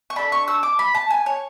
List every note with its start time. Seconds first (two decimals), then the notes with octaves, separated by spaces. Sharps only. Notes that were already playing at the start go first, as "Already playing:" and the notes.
0.10 C#6
0.16 D4 A4 B5
0.32 C#6
0.48 E6
0.63 D6
0.79 B5
0.95 A5
1.10 G#5
1.26 C#5